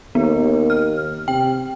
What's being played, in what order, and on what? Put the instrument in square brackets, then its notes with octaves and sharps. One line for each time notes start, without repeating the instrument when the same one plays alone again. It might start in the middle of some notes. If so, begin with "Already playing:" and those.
[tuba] D#2 [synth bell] B3
[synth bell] F6
[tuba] C3 [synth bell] G5